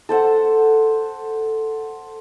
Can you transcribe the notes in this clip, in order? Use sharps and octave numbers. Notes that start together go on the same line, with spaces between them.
A4 C5 F#5